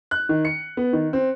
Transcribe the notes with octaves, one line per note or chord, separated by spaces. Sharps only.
F#6
D#3
C#7
B3
D#3
C4